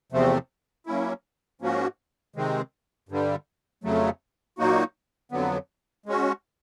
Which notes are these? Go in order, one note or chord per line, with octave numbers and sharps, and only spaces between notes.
E2 C3 F3 A3 C4
F#3 A#3 C#4 E4
G#2 F3 A#3 C#4 F#4
C3 D#3 G#3 C4
G2 D3 G3
F2 C#3 F#3 A3
A#2 F#3 A#3 D#4 F#4
F2 D3 F#3 B3
G#3 C#4 F#4